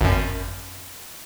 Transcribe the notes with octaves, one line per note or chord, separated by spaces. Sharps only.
G#1 F#2